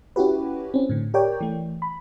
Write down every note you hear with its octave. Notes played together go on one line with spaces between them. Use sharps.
C#4 E4 F#4 G4 B4
C4 C#4
A2 D3
G4 A#4 C#5 D5 G5
E3 A3
B5